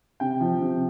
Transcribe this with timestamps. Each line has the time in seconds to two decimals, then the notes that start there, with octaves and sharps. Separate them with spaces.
0.20 C3 G5
0.40 F3
0.61 C3